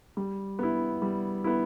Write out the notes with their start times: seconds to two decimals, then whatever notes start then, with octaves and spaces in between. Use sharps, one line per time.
0.17 G3
0.59 B3 E4
1.02 G3
1.44 B3 E4